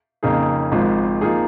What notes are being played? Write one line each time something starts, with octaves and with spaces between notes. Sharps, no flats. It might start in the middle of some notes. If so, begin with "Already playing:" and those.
F2 C#3 A#3 D#4 G#4
G#1 G#2 F3
F3 A#3 D#4 G#4